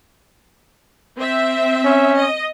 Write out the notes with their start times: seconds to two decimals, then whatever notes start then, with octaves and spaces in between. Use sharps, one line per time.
1.18 C4 E5
1.85 C#4
2.17 D#5